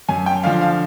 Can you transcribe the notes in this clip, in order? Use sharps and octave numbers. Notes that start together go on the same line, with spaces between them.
F#2 G#5
G5
D3 F3 F5
F5